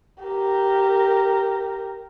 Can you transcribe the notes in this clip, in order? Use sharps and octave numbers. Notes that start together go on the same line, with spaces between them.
G4 A#4